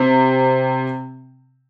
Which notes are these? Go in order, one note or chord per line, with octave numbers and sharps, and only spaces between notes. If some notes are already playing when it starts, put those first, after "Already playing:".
Already playing: C3 C4